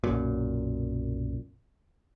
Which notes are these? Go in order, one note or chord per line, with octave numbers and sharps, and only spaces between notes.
B1 F#2 A#2